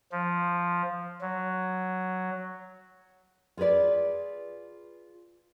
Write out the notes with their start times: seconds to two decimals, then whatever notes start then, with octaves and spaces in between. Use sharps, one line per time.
0.12 F3
1.21 F#3
3.57 F4 G#4 A4 B4 D5